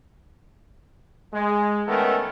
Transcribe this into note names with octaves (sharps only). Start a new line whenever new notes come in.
G#3
D#3 A3 B3 C#4 A4 A#4